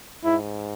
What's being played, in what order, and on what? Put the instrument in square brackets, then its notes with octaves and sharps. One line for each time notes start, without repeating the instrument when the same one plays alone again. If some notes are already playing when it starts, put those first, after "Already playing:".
[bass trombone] G#2 [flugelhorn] E4